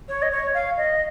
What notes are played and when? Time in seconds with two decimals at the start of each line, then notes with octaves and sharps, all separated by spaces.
0.09 C#5
0.22 D#5
0.31 C#5
0.54 F5
0.77 D#5